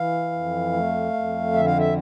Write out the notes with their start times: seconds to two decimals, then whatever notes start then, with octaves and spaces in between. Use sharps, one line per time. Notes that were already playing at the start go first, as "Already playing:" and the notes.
Already playing: E3 F5
0.32 F2
0.73 A3
1.13 F2
1.53 D3 E5
1.65 F5
1.78 E5